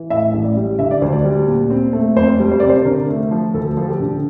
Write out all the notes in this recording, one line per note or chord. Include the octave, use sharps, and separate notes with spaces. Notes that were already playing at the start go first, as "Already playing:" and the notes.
Already playing: E3
A2 E5
A1
D5
G3
D3 E5
D5
D2 C5
D5
G3
A#2
C4
A3
F2 C5
G3
C5
C3 D5
C5
D3 A#4
A3
F3
D2 A4
F3 A4
G4
D3